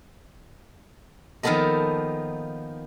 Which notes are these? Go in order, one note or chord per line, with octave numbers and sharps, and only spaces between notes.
D#3 F3 A#3 B3 A4 D#5